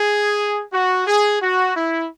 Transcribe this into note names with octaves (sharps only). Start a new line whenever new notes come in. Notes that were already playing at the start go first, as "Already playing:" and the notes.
Already playing: G#4
F#4
G#4
F#4
E4